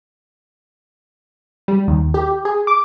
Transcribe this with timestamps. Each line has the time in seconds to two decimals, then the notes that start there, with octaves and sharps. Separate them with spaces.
1.68 G3
1.88 D#2
2.14 G4
2.45 G#4
2.67 D6